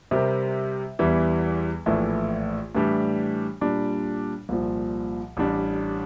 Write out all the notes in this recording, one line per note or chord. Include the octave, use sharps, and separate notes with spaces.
C3 G3 C4 G4 A#4
E2 E3 G3
A#1 A2 E3 A3
A2 E3 G3 D4 G4
A#2 G3 D4
C2 A#2 F3
A1 A2 G3 D4